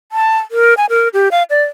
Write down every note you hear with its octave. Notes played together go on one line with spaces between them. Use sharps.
A5
A#4
G#5
A#4
G4
F5
D5